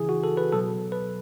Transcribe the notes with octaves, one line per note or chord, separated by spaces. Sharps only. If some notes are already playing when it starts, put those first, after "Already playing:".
Already playing: C#3 E3 E4 G#4
F#4
A4
B4
B2 F#3 A4
B4